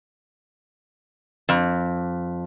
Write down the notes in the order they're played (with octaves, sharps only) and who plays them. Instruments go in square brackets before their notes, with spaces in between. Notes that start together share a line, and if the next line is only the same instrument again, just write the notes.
[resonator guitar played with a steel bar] F2